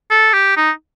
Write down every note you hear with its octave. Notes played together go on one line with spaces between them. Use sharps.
A4
G4
D#4